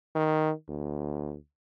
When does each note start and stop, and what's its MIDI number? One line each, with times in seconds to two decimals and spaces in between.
0.15 0.52 51
0.69 1.35 38